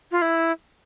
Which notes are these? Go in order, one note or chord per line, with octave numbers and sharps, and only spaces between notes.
F4
E4